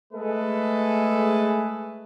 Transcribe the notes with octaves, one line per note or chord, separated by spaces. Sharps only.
G#3 A3 G#4 A4 B4